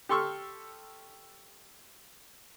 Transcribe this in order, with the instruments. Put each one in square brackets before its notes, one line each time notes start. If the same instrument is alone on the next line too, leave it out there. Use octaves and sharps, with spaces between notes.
[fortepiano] G4 A4 C6 C#6 E6 F6